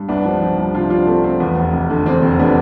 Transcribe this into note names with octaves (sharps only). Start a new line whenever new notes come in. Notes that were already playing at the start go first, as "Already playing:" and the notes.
Already playing: G2
C2 B3 D4
F3
F3
C2
C3 D4 F4
F3 D4 F4
A3 C4
A3 C4
E2 B3
F1
F1
D3
E2 C4
F1
D3 B3 D4